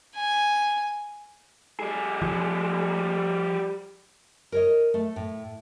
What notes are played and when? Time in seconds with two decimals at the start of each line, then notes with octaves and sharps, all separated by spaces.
0.16 G#5
1.80 G3 G#4
2.22 F3
4.52 A#4 C#5 D#5
4.94 A3
5.16 A2